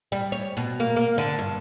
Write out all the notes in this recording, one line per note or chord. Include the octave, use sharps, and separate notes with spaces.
G3
C#5
B2
A#3
A#3
D3
G2